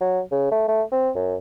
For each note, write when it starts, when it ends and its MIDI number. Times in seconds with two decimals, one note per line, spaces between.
0.01 0.21 54
0.31 0.49 49
0.51 0.64 57
0.68 0.83 57
0.92 1.10 60
1.15 1.35 42